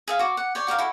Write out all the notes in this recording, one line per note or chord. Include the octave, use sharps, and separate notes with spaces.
G#4 E5 F5
F#4 D6
F#5
G4 C#5 D5
F#4 G4 A#4 F5
E4 F#4 A4